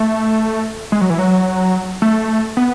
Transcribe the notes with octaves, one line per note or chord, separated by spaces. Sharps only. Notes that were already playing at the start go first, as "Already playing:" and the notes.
Already playing: A3
G#3
F#3
E3
F#3
A3
B3